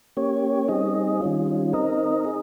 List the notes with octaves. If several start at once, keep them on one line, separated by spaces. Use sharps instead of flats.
A#3 C#4 G4 C#5
G3 C4 D#4 G#4 D#5
D#3 G3 C#4 F4
C4 D#4 A#4 D#5
G#4 D#5